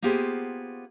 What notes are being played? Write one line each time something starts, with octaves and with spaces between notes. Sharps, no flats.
A#3 B3 F4 G4 G#4 C5